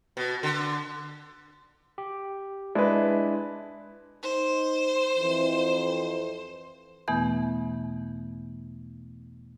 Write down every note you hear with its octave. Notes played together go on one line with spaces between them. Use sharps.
B2
D3
G4
G#3 D4 E4 B4 D5
D#4 C5
F2 E3
E2 B2 E3 A3 B3 G6